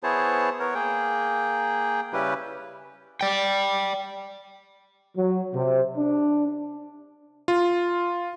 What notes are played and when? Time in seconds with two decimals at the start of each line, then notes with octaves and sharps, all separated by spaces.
0.03 B3 E4 G#4 C5 C#5 A5
0.59 B3 A#4 C#5
0.75 A#3 G#4 G5
2.13 C#3 G3 C#4 E4 G4 B4
3.21 D5 G5
5.17 F#3
5.55 C3
5.96 D4
7.48 F4